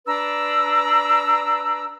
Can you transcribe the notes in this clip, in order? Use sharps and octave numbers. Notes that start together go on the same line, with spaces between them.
D4 B4 A#5 E6